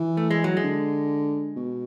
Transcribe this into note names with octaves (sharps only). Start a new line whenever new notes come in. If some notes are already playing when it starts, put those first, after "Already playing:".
Already playing: E3
A3
G#3
F#3
G#3
D3
B2